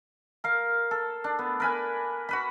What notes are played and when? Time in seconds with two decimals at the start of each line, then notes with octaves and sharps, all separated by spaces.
0.44 A#4 F5
0.91 A4
1.24 D4
1.39 B3
1.60 A#4 B4 G#5
2.29 F#4 B4 B5